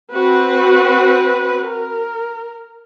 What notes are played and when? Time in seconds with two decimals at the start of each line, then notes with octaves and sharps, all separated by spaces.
0.12 C4 F#4 B4
1.68 A#4